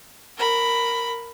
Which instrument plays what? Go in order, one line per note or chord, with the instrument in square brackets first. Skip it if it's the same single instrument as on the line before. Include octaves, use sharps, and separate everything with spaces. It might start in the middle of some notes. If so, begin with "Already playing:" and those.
[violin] A#4 B5